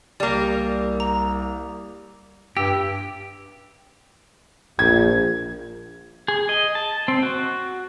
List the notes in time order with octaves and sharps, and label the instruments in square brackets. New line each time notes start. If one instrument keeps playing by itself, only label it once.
[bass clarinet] C2 [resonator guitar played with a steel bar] G3 A#3 [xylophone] D5
[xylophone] A#5
[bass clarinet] G2 [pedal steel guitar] G4 [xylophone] E6
[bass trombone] A#1 [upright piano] G#6
[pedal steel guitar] G#4
D#5
A5
C4
F#4